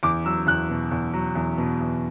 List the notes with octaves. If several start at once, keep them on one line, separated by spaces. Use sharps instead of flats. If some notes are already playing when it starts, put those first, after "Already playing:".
E2 D6
F#3 E6
E2 F#6
B2
E2
F#3
E2
B2
E2